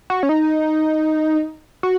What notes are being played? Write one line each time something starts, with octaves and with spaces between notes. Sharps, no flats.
F#4
C#4
D#4
F#4